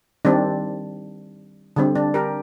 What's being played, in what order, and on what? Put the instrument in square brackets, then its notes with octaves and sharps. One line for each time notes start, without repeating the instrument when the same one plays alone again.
[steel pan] D#3 G3 C4 D4
D3 G3 C4
D4
G4 A#4